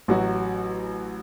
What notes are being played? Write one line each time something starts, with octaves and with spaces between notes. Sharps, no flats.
A1 F#3 F#4